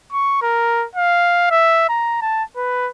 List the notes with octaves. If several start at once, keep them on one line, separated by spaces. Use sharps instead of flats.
C#6
A#4
F5
E5
A#5
A5
B4